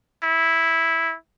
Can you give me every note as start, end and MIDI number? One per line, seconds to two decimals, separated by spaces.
0.23 1.14 64